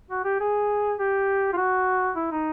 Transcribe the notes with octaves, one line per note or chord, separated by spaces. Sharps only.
F#4
G4
G#4
G4
F4
F#4
E4
D#4